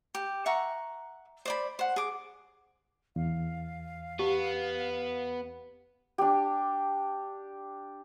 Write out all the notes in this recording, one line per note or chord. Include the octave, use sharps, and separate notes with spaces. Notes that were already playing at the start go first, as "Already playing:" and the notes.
G4
E5 F#5 A#5 C#6
C5 D5 B5
C5 F#5
G#4 D6
E2 F5
B3 G4
D4 G4